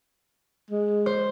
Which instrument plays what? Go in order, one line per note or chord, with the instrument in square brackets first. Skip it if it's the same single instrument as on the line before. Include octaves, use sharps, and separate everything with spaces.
[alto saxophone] G#3
[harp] C5